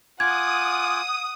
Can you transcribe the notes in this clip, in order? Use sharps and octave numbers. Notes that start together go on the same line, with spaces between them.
F4 F#5 G#5 D6 D#6 G#6